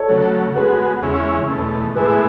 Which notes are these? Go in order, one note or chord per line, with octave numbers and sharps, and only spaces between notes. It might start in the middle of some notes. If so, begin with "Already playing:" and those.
Already playing: A4 C#5
C#3 F#3 A3
G#3 B3 F#4 G#4 B4
E2 C#3 G#3 C#4 E4
E2 B2 A3
A2 E3 G#3 B3 E4 G#4 B4